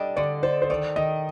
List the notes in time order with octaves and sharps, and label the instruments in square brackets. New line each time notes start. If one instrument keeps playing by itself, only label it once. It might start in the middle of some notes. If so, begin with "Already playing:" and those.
Already playing: [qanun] G3 D4 A4 [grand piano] D#5
[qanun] D3 [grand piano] D5
[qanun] A4 [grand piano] C5
[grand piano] C5
[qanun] D#3 [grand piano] D5
[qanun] D#3 [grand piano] D#5